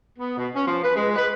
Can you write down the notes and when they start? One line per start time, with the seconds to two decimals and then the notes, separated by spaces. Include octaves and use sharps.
0.19 B3
0.37 B2
0.54 C#4
0.67 F3
0.83 B4
0.96 G#3
1.16 B4